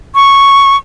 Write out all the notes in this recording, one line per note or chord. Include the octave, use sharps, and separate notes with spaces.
C#6